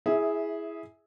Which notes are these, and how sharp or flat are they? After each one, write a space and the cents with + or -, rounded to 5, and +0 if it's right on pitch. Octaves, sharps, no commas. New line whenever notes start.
E4 +0 G#4 +0 E5 -20